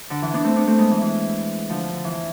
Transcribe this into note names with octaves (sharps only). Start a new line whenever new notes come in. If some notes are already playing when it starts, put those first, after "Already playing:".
D3
E3
B3 D4
A3 C4
B3 D4
A3 C4
G#3 B3
E3
E3
D3 F3
D3
E3